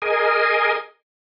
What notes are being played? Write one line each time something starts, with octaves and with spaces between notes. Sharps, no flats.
G#4 A#4 D#5 G#5